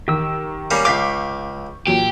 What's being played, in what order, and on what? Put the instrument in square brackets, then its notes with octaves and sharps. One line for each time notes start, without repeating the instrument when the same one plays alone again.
[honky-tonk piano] D#3 [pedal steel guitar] G4 E6
[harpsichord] G3 A#3 C#4
[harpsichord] C#2 F5 [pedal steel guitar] C#6 D6 [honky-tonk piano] G6 B6 C7
[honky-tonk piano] A#2 F#3 [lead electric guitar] G4